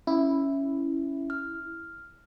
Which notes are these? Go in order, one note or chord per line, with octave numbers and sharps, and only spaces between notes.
C#4 E4
F6